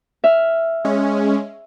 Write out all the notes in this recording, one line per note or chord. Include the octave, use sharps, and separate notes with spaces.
E5 F6
G#3 C#4